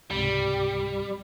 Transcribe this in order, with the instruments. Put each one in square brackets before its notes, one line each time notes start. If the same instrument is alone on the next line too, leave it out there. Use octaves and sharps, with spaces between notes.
[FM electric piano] C#2 G#2 C3 [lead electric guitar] G3